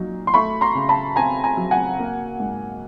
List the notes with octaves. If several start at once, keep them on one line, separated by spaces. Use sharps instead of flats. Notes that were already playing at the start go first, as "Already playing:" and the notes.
Already playing: A#2 F#3 D#4
C6
A3 B5 C#6
A#5 C6
C#3
A5 B5
C4 G#5 A#5
G#5 A#5
F#3
F#5 G#5
A#3
G#2